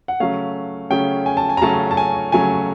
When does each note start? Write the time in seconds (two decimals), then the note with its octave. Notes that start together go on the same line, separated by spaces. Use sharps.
0.08 F#5
0.20 C#3 F#3 A3 C#4 F5
0.90 C#3 F#3 A3 C#4 G5
1.26 G#5
1.37 A5
1.49 G#5
1.57 A#5
1.62 C#3 F#3 A3 C#4 A5
1.91 A5
1.97 G#5
2.32 C#3 F#3 A3 C#4 G#5